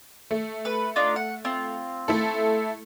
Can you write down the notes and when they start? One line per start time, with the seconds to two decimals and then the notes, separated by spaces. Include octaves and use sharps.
0.31 A3
0.65 B4
0.96 D4 D#4 F4
1.16 F#5
1.45 C4 F4
2.08 A3 E4 A4